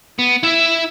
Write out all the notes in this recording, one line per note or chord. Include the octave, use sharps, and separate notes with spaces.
B3
E4 E5